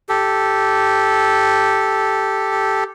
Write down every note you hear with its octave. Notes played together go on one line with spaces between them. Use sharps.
G4 A4